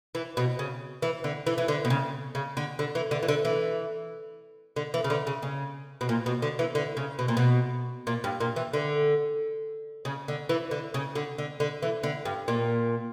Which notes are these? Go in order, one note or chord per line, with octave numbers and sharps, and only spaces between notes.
E3
B2
C#3
E3
D3
E3
E3
D3
B2
C#3
C#3
D3
D3
E3
D3
E3
D3
E3
D3
E3
C#3
D3
C#3
C#3
B2
A#2
B2
D3
E3
D3
C#3
B2
A#2
B2
A#2
G2
A#2
E3
D3
C#3
D3
E3
D3
C#3
D3
D3
D3
E3
D3
G2
A#2